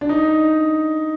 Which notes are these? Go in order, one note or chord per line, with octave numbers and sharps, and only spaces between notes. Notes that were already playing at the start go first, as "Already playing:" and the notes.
D4
D#4